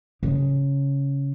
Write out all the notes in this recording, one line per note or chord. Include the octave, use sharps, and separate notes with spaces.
C#3